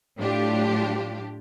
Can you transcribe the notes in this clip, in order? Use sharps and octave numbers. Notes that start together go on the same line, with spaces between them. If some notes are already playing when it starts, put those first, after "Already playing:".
A2 F#3 D4 F4 G4